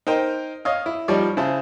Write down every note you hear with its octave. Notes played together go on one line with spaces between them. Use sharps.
D#4 A#4 C5 G5
C#5 D#5 F5
E4
F3 G3 D#4 C#5 D5
C#3 E4 C5 A5